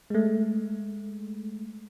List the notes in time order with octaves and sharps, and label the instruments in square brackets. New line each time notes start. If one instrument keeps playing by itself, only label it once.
[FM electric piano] G#3 A3